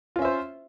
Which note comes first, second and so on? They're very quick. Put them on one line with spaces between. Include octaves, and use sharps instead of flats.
F4 C#4 E5 C5